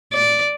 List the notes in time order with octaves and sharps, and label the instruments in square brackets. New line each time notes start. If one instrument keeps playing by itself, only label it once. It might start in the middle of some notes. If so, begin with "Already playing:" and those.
[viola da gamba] D5